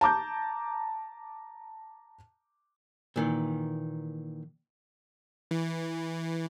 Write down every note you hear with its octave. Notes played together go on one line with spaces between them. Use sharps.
A5 A#5 D6 G6
A#2 D#3 E3
E3